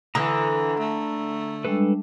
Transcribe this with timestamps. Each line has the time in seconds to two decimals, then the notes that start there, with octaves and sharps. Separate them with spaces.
0.15 D3 E3 A#5 D#6 E6
0.79 A3
1.65 G3 G#3 D4 A4 B4